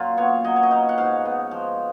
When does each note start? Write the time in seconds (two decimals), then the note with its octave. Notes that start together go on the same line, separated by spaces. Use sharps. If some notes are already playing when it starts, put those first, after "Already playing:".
Already playing: F#2 A#2 F4
0.17 B3 C#5
0.44 F#3 D#5
0.56 C#5
0.63 D#5
0.71 D#4 F5
0.89 F#5
0.98 G#2 F5
1.25 B3
1.51 F3